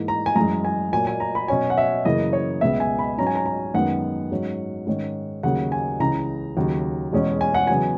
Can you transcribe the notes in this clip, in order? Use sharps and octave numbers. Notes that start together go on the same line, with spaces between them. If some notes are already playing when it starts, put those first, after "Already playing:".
Already playing: G#2 E3 A#3
A#5
G#5
F#2 E3 G#3 A#5
G#5
A#2 F#3 A#3 G#5
G#5
A#5
B5
B2 F#3 C#4 G#5
F#5
E5
F#2 C#3 E3 A#3 D#5
C#5
C#2 B2 G#3 B3 E5
G#5
B5
G#2 F#3 C#4 A#5
G#5
A#5
A#5
F#2 D#3 G#3 B3 F#5
G#2 F#3 C#4
G#2 D#3 G#3 C#4
D#2 C#3 F#3 A#3 F#5
G#5
C#2 C#3 E3 A#5
D#2 C#3 F#3
E2 B2 G#3 C#4
G#5
F#5
E2 C#3 F#3 B3 G#5